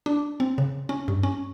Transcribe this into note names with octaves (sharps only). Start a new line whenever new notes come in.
D4
C4
C#3
C#4
G2
C#4